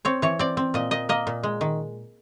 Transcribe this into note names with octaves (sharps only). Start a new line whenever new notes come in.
C4 C#5
E3 C#5
C4 D5
C4
A#2 D#5
A#2 D#5
A#3 D#5
A#2
G#3
D#3